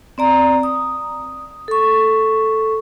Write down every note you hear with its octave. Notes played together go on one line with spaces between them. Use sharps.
C4 D5 A#5
D#6
A4 C#6